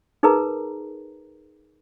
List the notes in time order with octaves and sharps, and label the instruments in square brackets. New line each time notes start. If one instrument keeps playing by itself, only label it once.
[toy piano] D#4 G#4 A#4 B4 A#5